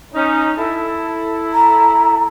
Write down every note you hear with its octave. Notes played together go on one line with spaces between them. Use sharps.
C#4 D#4
E4 A4
A#5